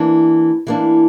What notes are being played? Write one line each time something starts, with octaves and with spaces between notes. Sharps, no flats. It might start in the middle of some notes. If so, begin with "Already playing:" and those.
Already playing: E3 A#3 D4
E3 A#3 D4